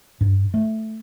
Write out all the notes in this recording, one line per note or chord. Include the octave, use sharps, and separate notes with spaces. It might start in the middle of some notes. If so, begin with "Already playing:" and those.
G2
A3